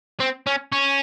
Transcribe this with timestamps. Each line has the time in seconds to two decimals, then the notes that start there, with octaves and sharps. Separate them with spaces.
0.20 C4
0.47 C#4
0.72 C#4